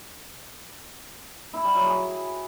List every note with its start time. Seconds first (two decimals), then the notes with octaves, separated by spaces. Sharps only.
1.53 E4
1.64 G3
1.75 F#3
1.86 G#4